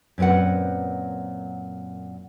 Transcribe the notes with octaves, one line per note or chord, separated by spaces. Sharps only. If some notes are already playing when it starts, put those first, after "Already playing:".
F#2 A#2 C4 B4 F#5